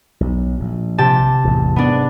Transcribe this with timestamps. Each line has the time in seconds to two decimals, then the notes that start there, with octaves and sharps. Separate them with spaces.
0.20 B1
0.60 A#1
0.98 C3 G4 A5
1.44 A1 E2
1.76 G#2 B3 D4